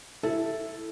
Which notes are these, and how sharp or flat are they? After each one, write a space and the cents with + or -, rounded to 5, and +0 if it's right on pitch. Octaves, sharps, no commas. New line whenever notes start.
E4 +0 A4 +0